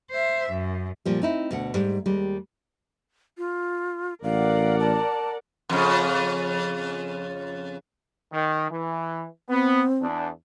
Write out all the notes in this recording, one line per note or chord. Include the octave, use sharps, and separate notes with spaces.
C5 E5
F#2
A#2 F3 G3
C4 D#4 E4
D2 B2 F#5
G#2 G3
D#2 G3 G#3
F4
A1 A#4 D5 F5 F#5
A5
F2 C#3
D#3
E3
B3 C4
E2 D4